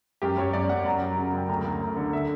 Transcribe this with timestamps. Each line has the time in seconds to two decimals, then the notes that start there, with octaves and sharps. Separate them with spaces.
0.22 F#2 G4
0.37 F#2 C#5
0.53 F#2 D5
0.69 F#2 F#5
0.85 F#2 A#5
1.02 F#3
1.18 C#3
1.33 F#2 G5
1.48 D2 A#5
1.65 D2
1.81 D2
1.97 D3
2.13 E5